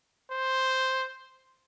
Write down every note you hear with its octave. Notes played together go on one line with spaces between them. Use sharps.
C5